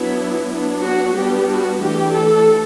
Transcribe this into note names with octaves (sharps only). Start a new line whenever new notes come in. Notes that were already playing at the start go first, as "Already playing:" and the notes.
Already playing: F#3 B3 D4 E4
F#3 B3 D4
F#4
G3 B3 D4 G4
F#4
E3 A3 D4 G4
A4